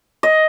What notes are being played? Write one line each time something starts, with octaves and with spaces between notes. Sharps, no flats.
D#5